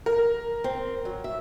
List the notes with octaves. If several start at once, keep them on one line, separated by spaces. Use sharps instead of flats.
A#4
C4
F#3
E5